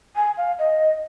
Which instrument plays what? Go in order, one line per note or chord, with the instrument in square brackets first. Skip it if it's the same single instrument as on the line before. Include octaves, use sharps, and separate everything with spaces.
[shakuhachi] G#5
F5
D#5